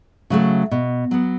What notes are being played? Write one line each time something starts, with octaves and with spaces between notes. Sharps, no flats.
C#3 F#3 A3
B2
F#3 B3